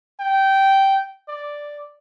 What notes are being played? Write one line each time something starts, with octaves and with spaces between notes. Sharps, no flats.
G5
D5